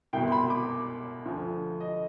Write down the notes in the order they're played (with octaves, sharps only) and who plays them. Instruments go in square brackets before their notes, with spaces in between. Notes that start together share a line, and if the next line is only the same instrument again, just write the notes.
[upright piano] C2 G5
B2
C6
B5
D6
D2 D3 F3
D#5